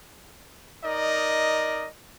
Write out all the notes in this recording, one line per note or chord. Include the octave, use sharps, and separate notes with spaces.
D#4 A#4 D5 D#5